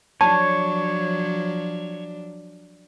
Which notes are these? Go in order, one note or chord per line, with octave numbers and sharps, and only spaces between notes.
F3 F#3 D4 C#5 A5